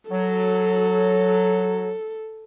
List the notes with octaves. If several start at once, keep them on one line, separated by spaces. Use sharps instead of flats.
F#3 A4